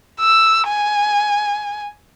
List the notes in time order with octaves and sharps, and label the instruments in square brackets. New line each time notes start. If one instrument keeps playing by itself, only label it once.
[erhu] E6
G#5